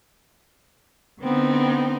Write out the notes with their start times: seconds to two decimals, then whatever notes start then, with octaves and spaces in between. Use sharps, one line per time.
1.20 D3 B3 C4 D#4